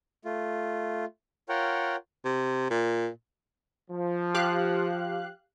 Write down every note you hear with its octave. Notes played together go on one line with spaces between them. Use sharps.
A3 F4
F4 A#4 C#5 F#5 G5
C3
A#2
F3
G4 F5 F#6